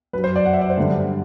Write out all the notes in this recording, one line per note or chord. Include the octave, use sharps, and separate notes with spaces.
F#2 B4
F#3
C5
D5
F#5
E5
D5
C5
G2 D3 G3